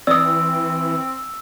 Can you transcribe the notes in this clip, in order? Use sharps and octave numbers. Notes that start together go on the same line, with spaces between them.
E3 C4 D5 D#6 E6